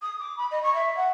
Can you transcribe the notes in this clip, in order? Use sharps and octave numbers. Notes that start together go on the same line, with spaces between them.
D#6
D6
B5
D#5
C#6
E5
F#5